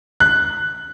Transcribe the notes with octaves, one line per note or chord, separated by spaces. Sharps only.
F#6